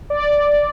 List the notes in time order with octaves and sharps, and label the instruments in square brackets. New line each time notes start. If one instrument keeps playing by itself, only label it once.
[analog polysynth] D5